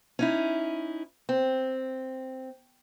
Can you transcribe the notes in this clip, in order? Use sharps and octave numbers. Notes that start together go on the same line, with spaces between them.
C#4 D#4 E4
C4